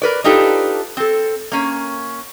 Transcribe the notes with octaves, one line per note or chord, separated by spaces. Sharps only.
A#4 B4 D5
D4 D#4 F4 G4 A4 B4
C4 A4
A#3 C#4